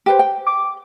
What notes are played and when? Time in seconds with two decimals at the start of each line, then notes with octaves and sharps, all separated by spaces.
0.06 G4 B4 C5
0.19 G5
0.47 D6